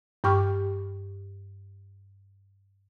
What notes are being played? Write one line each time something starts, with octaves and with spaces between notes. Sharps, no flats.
G2 G4 G5 C#6 D6 F6